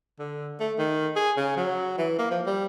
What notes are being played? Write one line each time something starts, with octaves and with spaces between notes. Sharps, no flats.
D3
A3
D#3
G#4
C#3
F#3
E3
A#3
F3
G3